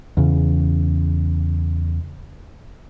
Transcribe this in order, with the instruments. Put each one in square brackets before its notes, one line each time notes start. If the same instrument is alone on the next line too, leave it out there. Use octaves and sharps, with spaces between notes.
[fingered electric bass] E2 C#3